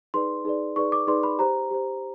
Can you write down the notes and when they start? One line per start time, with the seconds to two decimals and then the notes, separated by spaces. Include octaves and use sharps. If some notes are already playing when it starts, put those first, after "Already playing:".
0.14 D#4 G#4 B4 D5 C6
0.45 D#4 G#4 B4 D5
0.76 D#4 G#4 B4 D5 C#6
0.92 D6
1.07 D#4 G#4 B4 D5 C6
1.23 B5
1.39 G4 C5 A#5
1.70 G4 C5